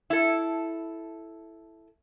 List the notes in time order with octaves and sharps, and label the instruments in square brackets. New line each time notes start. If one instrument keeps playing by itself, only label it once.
[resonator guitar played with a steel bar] E4 A4